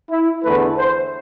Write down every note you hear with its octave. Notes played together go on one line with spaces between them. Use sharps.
E4
E2 D3 A3 B4
C5